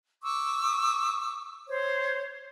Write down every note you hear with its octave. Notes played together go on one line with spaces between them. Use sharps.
C#6 D6 E6
C5 C#5